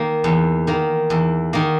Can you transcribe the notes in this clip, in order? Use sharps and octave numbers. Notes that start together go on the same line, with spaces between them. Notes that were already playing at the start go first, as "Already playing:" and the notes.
Already playing: D#3 A#3
E2
D#3 A#3
E2
D#3 A#3